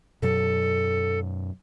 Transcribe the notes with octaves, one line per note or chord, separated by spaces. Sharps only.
F#2 B2 F#3 A4